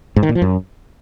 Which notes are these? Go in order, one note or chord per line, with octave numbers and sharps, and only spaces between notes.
G#2
D#3
A#2
F3
F#2